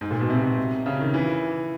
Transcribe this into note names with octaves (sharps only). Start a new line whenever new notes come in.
G#2
A#2
B2
C3
C#3
D#3
E3